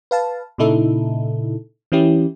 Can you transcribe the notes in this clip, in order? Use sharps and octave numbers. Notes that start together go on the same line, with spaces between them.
B4 F5 A5
A#2 C#3 D#4 E4 A4
E3 C#4 E4 G4